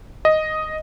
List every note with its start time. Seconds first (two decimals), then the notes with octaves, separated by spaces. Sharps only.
0.25 D#5